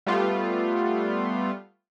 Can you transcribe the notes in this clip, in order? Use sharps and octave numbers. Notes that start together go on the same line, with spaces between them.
G3 A3 B3 F4